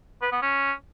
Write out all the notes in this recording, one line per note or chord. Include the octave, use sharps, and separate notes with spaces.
B4
B3
C#4